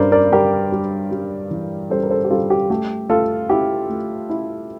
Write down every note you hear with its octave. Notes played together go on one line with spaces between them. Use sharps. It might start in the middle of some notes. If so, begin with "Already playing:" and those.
Already playing: G2 G3 A#4 C5 D5
A#4 D5
G3 G4 A#4
G3
G3
E3
G3 A4 C5
A#4
A4 C5
G4
G3 F4 A4
G4
A3 G4
A3 F4 A4
E4 G4
A3
E4